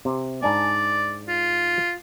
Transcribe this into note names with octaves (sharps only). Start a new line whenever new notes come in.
C3
G#2 D4 D5 G#5
F4